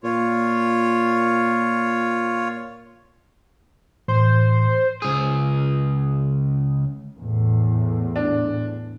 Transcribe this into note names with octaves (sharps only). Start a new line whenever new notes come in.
A#2 F4 C#5
A2 E3 C5
C#2 G#4
E2 A2
D4